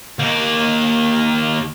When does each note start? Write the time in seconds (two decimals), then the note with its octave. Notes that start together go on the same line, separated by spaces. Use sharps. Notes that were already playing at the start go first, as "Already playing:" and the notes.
0.19 D#2 A#3